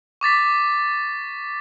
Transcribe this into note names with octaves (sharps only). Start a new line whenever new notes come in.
C#6 D6 A6 B6